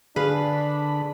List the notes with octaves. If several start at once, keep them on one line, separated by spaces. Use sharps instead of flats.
D3 D4 G#4 B4 F5 B5